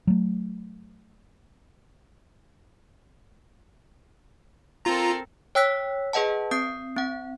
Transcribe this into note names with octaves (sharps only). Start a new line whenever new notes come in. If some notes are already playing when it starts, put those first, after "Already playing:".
F#3 A3
C4 F4 A4 A#4 A#5
C#5 G5 E6 F#6 B6
G#4 B4 D#5 F#5 A5
C4 D#6 G6 C7
C4 F#5